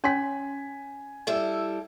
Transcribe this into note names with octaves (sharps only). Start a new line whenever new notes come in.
C#4 C#5 G#5 C6 B6
G3 E4 A4 D#5